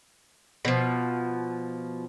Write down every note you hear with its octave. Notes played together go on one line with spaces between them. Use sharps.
B2 F3